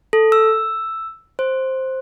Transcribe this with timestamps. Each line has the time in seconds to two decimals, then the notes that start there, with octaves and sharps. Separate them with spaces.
0.13 A4
0.32 E6
1.39 C5